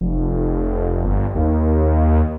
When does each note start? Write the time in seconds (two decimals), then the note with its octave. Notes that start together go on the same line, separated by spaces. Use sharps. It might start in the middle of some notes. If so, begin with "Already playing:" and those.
0.01 F1
1.04 G1
1.35 D#2